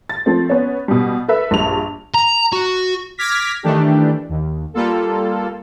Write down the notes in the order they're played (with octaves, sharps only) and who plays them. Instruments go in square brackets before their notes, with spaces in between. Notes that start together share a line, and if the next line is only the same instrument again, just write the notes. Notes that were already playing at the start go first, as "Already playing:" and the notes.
[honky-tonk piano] A6
F3 A3 C4
B3 C#4
B2 G3
A4 B4 E5
A#1 G2 F7
[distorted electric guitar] A#5
F#4
[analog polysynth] D6 F6 G#6 A#6 B6
D#3 E3 A3 D4 G4
D#2
G3 A#3 F4 A4